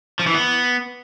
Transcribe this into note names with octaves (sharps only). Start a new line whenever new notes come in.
F3
E3
B3